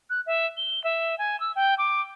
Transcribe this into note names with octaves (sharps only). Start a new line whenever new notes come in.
F#6
E5
G7
E5
G#5
E6
G5
D6